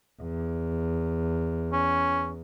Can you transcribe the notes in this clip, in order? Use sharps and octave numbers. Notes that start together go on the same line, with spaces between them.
E2
C#4